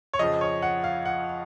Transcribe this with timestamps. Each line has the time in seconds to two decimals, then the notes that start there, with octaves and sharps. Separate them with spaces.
0.13 C#5
0.19 F2 C#3 F3 D#5
0.41 C#5
0.62 F#5
0.84 F5
1.05 F#5